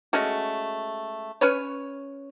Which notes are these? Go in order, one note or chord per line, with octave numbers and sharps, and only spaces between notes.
G#3 A3 C#4 F#4
C#4 B4 C#5